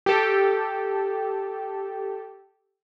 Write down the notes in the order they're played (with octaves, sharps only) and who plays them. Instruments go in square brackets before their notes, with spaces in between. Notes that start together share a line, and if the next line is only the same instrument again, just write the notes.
[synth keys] G4 A4